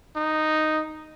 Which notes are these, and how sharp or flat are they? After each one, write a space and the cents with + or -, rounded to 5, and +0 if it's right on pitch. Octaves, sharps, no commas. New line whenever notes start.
D#4 -5